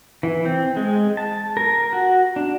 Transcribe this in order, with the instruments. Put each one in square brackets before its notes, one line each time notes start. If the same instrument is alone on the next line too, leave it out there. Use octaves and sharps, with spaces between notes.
[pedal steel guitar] E3
C4
G#3
A5
A#4
F#4
D4